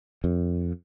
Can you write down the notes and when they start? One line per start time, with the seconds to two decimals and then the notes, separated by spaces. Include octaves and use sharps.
0.24 F2